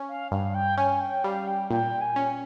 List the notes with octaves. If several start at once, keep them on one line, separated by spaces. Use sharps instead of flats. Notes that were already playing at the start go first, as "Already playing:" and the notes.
Already playing: C#4
F5
G2 F5
G5
C#4 G#5
G5
G3 F5
G5
A#2 G5
G#5
C#4